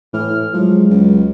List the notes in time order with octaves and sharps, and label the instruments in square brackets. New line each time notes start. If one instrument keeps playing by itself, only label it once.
[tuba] A2 [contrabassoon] E3 [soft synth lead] F6
[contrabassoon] F3 [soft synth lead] F#3 [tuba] G#3
[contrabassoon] C#2